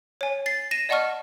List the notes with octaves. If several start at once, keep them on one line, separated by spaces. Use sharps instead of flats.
C#5 G#5
A6 C7
A#6 D#7 E7
D5 D#5 F#5 A5 C#6 F6